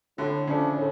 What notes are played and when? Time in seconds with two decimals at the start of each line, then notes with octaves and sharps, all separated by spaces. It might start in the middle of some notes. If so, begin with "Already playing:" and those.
0.18 A2 D3
0.47 C#3 F3 A3 D4
0.76 A2